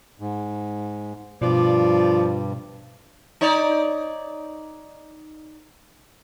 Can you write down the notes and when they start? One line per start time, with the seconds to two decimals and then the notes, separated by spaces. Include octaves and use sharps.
0.20 G#2
1.42 G2 B2 F3 D5
3.41 D#4 C#5 D5